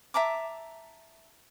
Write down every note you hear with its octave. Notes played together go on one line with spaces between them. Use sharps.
E5 A5 A#5 D6